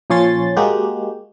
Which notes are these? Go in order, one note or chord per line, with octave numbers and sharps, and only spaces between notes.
A#2 F3 C#4 C#5 C6 A6
G#3 A#3 F#4 G4